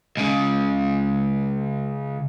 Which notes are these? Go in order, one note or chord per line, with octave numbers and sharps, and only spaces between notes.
C#2 C#3